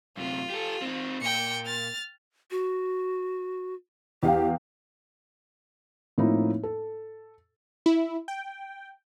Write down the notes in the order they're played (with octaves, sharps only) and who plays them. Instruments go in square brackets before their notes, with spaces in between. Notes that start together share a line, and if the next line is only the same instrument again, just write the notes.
[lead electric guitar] F#2 C3 [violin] F4
[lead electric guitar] G4 A4
C4 D#4
[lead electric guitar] A#2 [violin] G5 C#7
[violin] F6 A6
[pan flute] F#4
[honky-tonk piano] E2 F5 G5 [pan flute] G4
[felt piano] A2 F3 A#3 C4 D#4 E4
A4
[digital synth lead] E4
G5